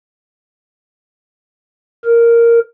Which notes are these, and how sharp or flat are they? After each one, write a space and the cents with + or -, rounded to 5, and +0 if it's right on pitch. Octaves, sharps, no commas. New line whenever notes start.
A#4 +0